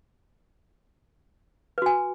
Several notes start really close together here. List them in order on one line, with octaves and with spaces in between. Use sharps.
B4 F#4 G#5